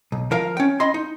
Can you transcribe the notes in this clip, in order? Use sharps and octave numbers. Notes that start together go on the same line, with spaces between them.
B1
F3 A#4 F5
C#4 G5
D#5 B5 C6
D#4